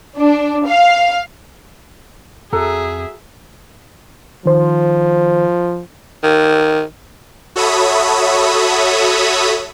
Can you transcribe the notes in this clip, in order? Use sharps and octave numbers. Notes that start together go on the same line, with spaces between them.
D4
F5
F2 F#4 G#4 A4 E5 A#5
D#3 F3 C5
D#3
F#4 A4 C#5 E5 B5 D#6